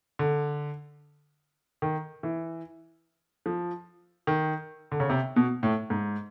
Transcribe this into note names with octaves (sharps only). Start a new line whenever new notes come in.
D3
D#3
E3
F3
D#3
D3
C#3
C3
B2
A2
G#2